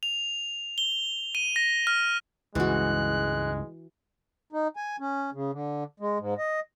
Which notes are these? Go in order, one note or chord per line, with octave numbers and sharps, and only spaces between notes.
F7
G7
D#7
A#6
F6
C#2 G2 C#3 E3 G#3 F#4 F#6
D#4
G#5
C#4
C#3
D3
G#3
G#2
D#5